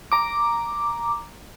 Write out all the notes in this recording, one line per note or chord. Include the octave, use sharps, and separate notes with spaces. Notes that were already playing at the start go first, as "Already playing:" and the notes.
A#5 D6